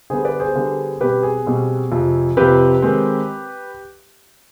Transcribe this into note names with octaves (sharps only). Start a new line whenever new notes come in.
D3 G3 B3 G#4 C5
B4 D5
G#4 C5
D3 G3 B3
B2 G3 C4 G4 B4
G#4
B2 G3 C4
F2 C3 F3 C4
F2 C3 F3 C4 G4 B4
D#3 G#3 C4